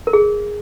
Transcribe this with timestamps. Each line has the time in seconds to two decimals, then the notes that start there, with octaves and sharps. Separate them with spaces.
0.07 A#4
0.13 G#4